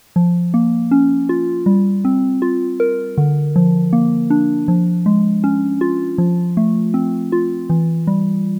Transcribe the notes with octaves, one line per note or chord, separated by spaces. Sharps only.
F3
A#3
C#4
F4
G3
C4
F4
A#4
D3
F3
A#3
D4
F3
G#3
C#4
F4
F3
A3
C4
F4
E3
G3